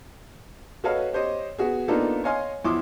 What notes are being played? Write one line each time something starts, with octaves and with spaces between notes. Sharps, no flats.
F#4 A4 B4 C#5 D#5 F5
G4 C5 C#5 D#5
B3 F#4 G#4
A#3 B3 D4 D#4 F4 A4
C#5 D#5 F5 G#5 C6
E2 F3 E4 C6 D6 D#6